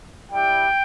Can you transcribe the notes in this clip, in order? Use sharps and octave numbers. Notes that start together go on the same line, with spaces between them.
G3 E4 G4 G5